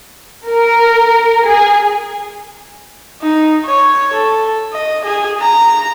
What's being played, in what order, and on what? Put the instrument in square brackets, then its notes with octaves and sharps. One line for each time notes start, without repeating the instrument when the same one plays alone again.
[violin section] A#4
G#4
[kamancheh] D#4
C#5
A4
D#5
G#4
A#5